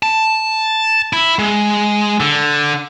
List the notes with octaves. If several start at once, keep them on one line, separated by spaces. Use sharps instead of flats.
A5
E4
G#3
D3